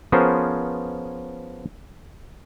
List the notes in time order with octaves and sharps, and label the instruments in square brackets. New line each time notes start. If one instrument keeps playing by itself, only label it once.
[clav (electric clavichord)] F3 B3 C#4 G#4 A#4 C5